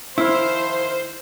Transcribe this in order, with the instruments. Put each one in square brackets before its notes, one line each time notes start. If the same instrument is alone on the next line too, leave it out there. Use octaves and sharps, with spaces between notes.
[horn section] D#3 F3 C6 [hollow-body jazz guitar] E4 [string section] C5 [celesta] E6 F6